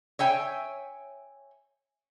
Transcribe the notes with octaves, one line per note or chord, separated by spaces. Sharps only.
C#5 E5 G5 G#5